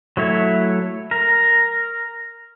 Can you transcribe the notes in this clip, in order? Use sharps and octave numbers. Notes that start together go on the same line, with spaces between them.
F#3 A3 E4 C#5
A#4